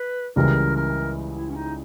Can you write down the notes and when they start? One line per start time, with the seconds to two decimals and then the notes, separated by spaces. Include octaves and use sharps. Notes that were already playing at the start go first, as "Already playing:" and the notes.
Already playing: B4
0.36 C#2 C#3 E3 G3 A#4
0.76 A#4
1.36 E4
1.50 C#4
1.56 D#4